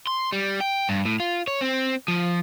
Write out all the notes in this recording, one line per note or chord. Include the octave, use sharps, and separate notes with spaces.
C6
G3
G5
G2
A2
F4
C#5
C4
F3